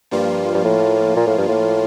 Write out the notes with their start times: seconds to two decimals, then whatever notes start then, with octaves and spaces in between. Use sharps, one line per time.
0.11 G2 F3 A#3 F4
0.54 G2
0.64 A2
1.16 A#2
1.27 A2
1.38 G2
1.48 A2